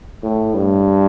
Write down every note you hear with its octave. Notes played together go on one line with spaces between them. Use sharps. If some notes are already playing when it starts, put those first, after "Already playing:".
A2
G2